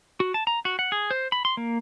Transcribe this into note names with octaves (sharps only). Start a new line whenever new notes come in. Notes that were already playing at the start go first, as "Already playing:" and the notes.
F#4
A5
A#5
F#4
F#5
G#4
C5
B5
C6
A#3